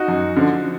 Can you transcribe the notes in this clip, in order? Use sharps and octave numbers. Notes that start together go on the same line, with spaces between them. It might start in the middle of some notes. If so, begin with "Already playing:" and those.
Already playing: D#4 F#4
F#2
D3 F3